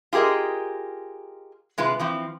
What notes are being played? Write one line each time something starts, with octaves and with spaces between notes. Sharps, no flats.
F4 G4 G#4 A#4 D#5
C3 G#3 F4 B4
E3 F3 C4